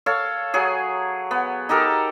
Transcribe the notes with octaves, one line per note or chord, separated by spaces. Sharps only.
A4 C#5 F5
F#3 G#4
B3
D#4 G4 A4 A#4